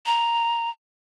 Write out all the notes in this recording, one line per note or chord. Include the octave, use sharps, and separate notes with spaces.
A#5